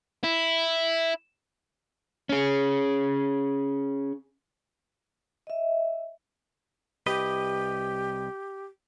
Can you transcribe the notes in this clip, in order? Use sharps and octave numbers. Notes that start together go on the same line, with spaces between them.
E4
C#4 G#4
D#5 E5
C2 G4 B4 D#5